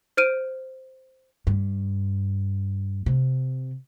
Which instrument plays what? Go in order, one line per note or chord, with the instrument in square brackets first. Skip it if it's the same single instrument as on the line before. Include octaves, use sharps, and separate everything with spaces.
[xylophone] C5 F6 D7 D#7
[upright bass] G2
C3